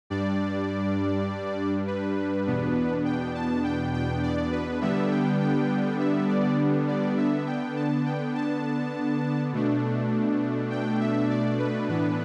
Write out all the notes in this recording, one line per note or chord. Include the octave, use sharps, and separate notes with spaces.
G2 G3 D4 D5
B4
E2 B2 B3 D4
G5
A5
G5
G5
D5
B4
D3 G3 B3 D4 E5
G5
G5
E5
D5
D5
D3 B3 D4 E5
G5
A5
G5
A5
B2 A3 D4
G5
E5
D5
B4
A2 E3 B3 D4 B4